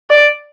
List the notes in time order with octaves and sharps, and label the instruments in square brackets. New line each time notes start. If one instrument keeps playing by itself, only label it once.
[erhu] D5